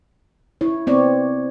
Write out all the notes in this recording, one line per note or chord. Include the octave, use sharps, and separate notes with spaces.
E4 C#5
B3 C4 C#5 D5